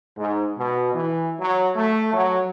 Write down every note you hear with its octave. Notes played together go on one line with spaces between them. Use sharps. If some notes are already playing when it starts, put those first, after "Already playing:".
G#2
B2
E3
F#3
A3
F#3